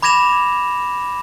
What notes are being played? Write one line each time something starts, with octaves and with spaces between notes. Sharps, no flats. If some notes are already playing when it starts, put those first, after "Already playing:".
B5 D6 G#6 A#6 E7 F7